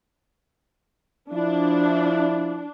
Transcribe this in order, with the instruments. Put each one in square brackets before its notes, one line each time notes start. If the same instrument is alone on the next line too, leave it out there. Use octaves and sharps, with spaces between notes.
[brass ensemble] F3 E4 [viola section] D4